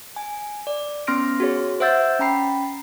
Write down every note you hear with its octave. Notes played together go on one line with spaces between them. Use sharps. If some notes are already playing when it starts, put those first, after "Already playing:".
G#5
D5
B3 C#4 C6 F6 A#6 D7
F#4 G#4 C#5
C5 E5 F#5 E6 G6 A6
C#4 G5 A#5 B5 C7